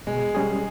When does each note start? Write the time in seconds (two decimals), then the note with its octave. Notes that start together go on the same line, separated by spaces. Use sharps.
0.07 B2 G#3
0.35 G3 C#4 G#4